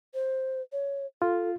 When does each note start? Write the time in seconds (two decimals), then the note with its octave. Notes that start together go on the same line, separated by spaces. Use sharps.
0.14 C5
0.72 C#5
1.22 F4 A4